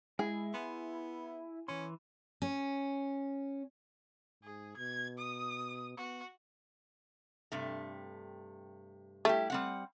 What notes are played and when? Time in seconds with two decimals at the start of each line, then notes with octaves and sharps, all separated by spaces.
0.19 G#3 E4 G#4
0.54 B3 G#5 C6
1.68 E3 C#4 C6
2.42 C#4
4.43 G#2 G#4
4.77 B2 G#6
5.18 D#6
5.97 B3 F#4
7.52 G2 C3 A3
9.25 G3 A3 E4 G4
9.50 G3 C4 F#5